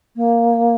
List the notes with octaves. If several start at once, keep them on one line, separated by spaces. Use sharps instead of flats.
A#3